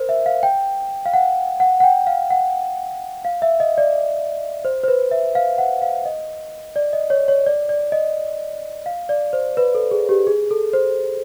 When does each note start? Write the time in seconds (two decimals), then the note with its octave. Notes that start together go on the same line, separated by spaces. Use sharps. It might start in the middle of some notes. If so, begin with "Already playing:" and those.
Already playing: A#4 C5
0.09 E5
0.26 F5
0.43 G5
1.06 F5
1.14 F#5
1.60 F#5
1.80 F#5
1.84 G5
2.07 F5
2.31 F#5
3.25 F5
3.42 E5
3.60 D#5
3.78 D5
4.65 C5
4.83 C5
4.88 B4
5.11 E5
5.35 F5
5.58 F#5
5.82 F5
6.06 D#5
6.76 D5
6.93 D#5
7.10 C#5
7.28 C#5
7.46 D5
7.69 D5
7.92 D#5
8.86 F5
9.09 D5
9.33 C5
9.57 B4
9.75 A4
9.91 G#4
10.09 G4
10.27 G#4
10.51 A4
10.73 C5